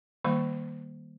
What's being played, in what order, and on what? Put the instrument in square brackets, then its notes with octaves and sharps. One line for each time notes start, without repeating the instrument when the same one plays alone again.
[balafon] D#3 G3 A#3 F5 C#6